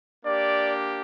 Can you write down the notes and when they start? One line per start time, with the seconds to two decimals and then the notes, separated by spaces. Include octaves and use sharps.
0.24 A#3 D4 G4 D5